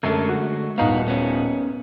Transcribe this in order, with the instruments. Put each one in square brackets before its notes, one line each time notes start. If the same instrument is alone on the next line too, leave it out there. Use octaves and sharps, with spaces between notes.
[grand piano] F#2 A4 [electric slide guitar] D3 G#3 A3
[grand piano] F#4
[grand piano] D#1 D#4 F5 [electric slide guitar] B3 F#4
[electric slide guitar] B3 C#4